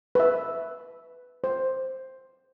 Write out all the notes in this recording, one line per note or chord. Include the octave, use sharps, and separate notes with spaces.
B4 E5
C5